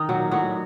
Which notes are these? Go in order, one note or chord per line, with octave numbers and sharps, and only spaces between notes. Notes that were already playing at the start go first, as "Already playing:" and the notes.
Already playing: D#3 D#4
A#2 F#3 F#4
A2 F#3 F#4